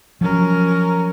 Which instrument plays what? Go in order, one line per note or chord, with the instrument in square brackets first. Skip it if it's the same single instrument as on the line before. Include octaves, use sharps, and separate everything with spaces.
[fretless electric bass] F3 F#3 [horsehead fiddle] C#4 A#4